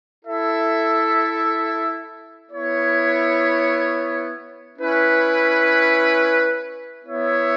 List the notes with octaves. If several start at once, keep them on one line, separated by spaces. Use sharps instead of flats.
E4 A4 E5
B3 E4 C#5
C#4 E4 B4
B3 E4 C#5 E5